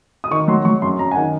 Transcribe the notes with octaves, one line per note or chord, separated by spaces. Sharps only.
D#6
D#3 C#6
F#3 C6
F#3 C#6
F#2 C6
F#2 A#5
G#5
D#3 F#5